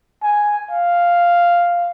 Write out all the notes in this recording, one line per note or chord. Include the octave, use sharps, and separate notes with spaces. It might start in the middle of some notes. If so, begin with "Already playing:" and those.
G#5
F5